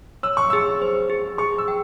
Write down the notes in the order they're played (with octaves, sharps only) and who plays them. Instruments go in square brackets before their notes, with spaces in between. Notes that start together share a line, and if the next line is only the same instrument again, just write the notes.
[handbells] C#5 [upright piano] E6
[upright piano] C#6
[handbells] G#4 [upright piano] E6
[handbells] C5
G#4
[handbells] G#4 [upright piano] C#6
[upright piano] E6
[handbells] G5